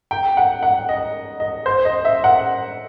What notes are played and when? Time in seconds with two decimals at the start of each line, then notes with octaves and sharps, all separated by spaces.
0.11 G5
0.37 F#5
0.63 F#5
0.89 D#5
1.40 D#5
1.66 C5
1.85 D#5
2.05 E5
2.24 F#5